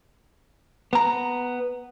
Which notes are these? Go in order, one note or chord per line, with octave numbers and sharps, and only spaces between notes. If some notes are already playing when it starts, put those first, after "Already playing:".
B3 A#5